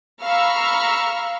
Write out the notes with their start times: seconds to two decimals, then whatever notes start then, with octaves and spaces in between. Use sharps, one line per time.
0.23 F5 A#5 B5 C#6 E6 F6